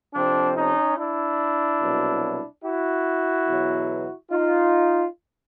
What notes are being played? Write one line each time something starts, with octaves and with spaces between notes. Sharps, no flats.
F2 C3 F3 C4 D4
C#4 D#4
D4 E4
C2 B2 F#3
E4 F#4
E2 B2 F#3
D#4 F4